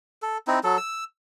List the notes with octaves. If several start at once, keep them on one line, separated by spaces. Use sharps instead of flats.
A4
C4 D#4 E4
F#3 A4
E6